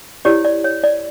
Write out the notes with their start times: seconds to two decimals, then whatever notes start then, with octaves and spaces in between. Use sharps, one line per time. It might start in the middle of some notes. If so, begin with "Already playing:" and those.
0.25 E4 G4 C#5 D5
0.45 D5
0.64 C#5
0.84 D5